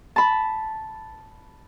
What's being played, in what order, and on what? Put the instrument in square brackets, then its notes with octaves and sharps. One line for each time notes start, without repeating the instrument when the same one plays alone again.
[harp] A5 B5